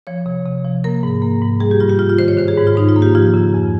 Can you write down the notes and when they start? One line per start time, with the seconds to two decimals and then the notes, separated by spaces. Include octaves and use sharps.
0.07 F3 C#5
0.26 C3
0.46 C3
0.65 F3
0.84 A#3 A#4
1.03 G#2
1.22 A#3
1.41 G#2
1.60 G3 G#4
1.71 G4
1.80 G2 F4
1.89 G4
1.99 G2 F4
2.10 F4
2.19 D#3 C5
2.28 C#5
2.37 D#3 C5
2.48 G#4
2.57 G#2
2.67 F4
2.76 G#2 D#4
2.89 F4
2.96 A#3
3.02 G4
3.15 F3 F4
3.34 C#3
3.54 F2